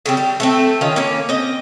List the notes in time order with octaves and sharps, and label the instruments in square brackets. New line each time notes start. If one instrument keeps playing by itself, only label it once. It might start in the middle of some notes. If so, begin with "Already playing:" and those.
[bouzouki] C#3 G3 C4
G3
A3 B3 C4
D#3 C#4 F4
A#3 C#4
C4 D#5